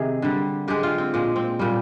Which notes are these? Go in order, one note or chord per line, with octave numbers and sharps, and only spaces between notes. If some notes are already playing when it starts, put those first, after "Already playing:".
Already playing: C3 D#3 G#4
D3 G3
D3 G#3 G4
F4
C4
A#2 G#3
C4
A#2 G3